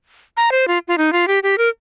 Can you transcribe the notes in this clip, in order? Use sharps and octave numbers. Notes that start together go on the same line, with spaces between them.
A#5
C5
F4
F4
D#4
F4
G4
G4
A#4